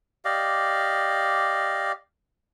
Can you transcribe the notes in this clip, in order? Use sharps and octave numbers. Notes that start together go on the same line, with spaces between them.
G4 D5 D#5 F5